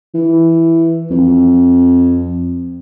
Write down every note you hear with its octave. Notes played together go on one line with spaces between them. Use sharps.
E3
F2